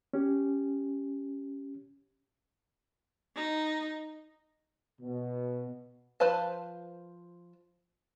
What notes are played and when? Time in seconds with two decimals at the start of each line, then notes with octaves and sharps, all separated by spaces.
0.13 C#4 G4
3.36 D#4
5.01 B2
6.20 F3 B4 C5 F5 A5